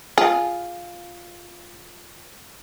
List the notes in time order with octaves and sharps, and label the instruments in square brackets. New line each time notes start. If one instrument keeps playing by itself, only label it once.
[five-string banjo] F4 [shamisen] G#4